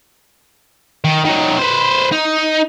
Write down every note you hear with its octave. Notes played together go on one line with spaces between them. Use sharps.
D#3
D#3 F#3
B4 C5
D#4